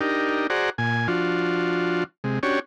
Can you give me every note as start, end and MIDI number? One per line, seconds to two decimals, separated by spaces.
0.01 0.47 62
0.01 0.47 63
0.01 0.47 67
0.01 0.47 70
0.50 0.70 66
0.50 0.70 68
0.50 0.70 72
0.50 0.70 74
0.50 0.70 78
0.50 0.70 82
0.78 1.07 46
0.78 1.07 80
1.08 2.04 53
1.08 2.04 62
1.08 2.04 65
1.08 2.04 66
2.24 2.39 48
2.24 2.39 56
2.43 2.60 61
2.43 2.60 62
2.43 2.60 66
2.43 2.60 67
2.43 2.60 73